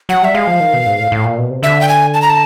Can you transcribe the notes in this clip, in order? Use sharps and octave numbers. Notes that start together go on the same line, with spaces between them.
F#3 F#5
G3 E5
G#3 F5
F3
D#3
B2
G#2
A2
A2
A#2
B2
C3
D3 E5
G5
G#5
A5
A#5
A5